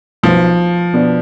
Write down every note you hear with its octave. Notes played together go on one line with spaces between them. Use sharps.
B1 B2 F3 B3
B2 B3 D4